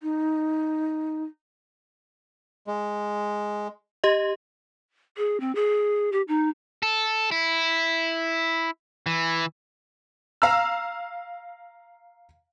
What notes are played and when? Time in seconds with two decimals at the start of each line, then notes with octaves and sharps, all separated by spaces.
0.03 D#4
2.67 G#3
4.04 G4 D#5
5.17 G#4
5.40 C4
5.55 G#4
6.12 G4
6.28 D#4
6.83 A4
7.31 E4
9.06 E3
10.42 F5 A#5 E6